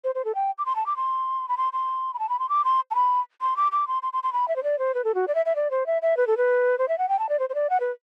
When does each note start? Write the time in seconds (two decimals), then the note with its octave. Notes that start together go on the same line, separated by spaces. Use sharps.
0.04 C5
0.15 C5
0.25 A4
0.35 G5
0.58 D6
0.66 C6
0.76 A5
0.86 D6
0.96 C6
1.49 B5
1.57 C6
1.73 C6
2.14 B5
2.19 A5
2.29 B5
2.39 C6
2.49 D6
2.64 C6
2.91 A5
2.95 B5
3.41 C6
3.56 D6
3.72 D6
3.87 C6
4.03 C6
4.13 C6
4.23 C6
4.33 B5
4.48 E5
4.56 C5
4.63 D5
4.79 C5
4.94 B4
5.04 A4
5.15 F#4
5.28 D5
5.35 E5
5.46 E5
5.55 D5
5.71 C5
5.86 E5
6.02 E5
6.17 B4
6.27 A4
6.37 B4
6.78 C5
6.88 E5
6.98 F#5
7.09 G5
7.19 A5
7.29 D5
7.39 C5
7.49 C5
7.55 D5
7.70 F#5
7.80 B4